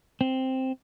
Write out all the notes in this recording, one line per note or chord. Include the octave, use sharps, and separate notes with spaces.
C4